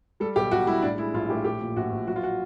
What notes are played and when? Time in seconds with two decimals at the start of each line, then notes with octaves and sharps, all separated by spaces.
0.20 G3 A4
0.36 B1 G4
0.51 B1 F#4
0.67 G3 E4
0.82 A2 D4
0.98 G#3 E4
1.14 A#1 F4
1.30 A2 G4
1.44 A#1 G4
1.61 A#2
1.76 A#1 F#4
1.92 A#1
2.07 F#3 F#4
2.16 F4
2.23 F#4